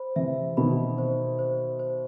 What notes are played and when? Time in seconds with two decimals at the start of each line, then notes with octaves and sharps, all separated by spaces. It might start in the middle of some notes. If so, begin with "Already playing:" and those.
Already playing: C5 B5
0.16 C3 E3 E5
0.57 B2 D#3 B5
0.98 C5
1.39 C5
1.79 C5